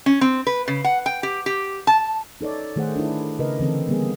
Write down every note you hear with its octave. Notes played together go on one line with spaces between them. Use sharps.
C#4
C4
B4
C#3
F#5
G5
G4
G4
A5
D#4 A4 C#5 D5
D#3 A3 G#4 C5 F#5
D4 E4
C#3 A#4 B4 D#5
D3 E3 C4 A4
G3 A#3 B3 G#4